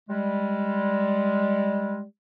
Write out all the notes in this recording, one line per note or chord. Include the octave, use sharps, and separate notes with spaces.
G3 G#3